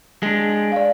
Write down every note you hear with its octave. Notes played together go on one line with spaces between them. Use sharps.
G#3 D4
D5 F5